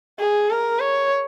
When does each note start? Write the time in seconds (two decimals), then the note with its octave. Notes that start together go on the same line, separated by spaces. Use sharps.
0.19 G#4
0.50 A#4
0.79 C#5